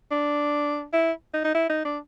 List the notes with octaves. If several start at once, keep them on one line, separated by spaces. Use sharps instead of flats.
D4
E4
D#4
D#4
E4
D#4
D4